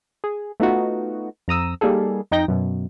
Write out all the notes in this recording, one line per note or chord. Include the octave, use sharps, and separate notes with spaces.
G#4
A3 B3 D#4 F4 F#4
F2 A#5 D#6 E6
G3 A#3 D#4 G#4 A4
F2 D#4 G5 G6 A#6
F#2 B2